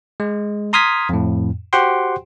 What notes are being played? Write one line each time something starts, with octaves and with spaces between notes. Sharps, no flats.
G#3
A#5 C6 D#6 F6 G#6 B6
F2 A2
F#4 G4 C5 F#5 G5 C6